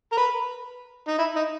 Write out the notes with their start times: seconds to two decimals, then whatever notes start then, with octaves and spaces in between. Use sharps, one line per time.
0.12 A#4
0.17 B4
1.08 D#4
1.18 E4
1.36 D#4